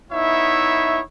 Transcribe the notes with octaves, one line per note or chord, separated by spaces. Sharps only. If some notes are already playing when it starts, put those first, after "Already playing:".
B3 D#4 E4 C#5 E5